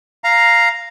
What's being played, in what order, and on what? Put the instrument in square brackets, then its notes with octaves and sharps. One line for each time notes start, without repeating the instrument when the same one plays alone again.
[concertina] F5 A#5